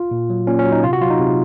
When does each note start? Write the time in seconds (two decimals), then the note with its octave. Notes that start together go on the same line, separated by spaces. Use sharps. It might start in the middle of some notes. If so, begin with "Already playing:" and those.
Already playing: F4
0.11 A#2
0.30 F#3
0.47 A#2 C#4
0.59 C#4
0.65 F#3
0.72 D#4
0.84 C3 F4
0.93 F#4
1.01 F#3 F4
1.10 D#4
1.19 C3